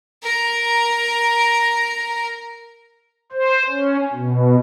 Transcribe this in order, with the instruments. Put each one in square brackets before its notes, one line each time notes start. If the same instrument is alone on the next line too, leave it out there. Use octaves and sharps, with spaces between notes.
[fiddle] A#4 A#5
[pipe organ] C5
C#4
B2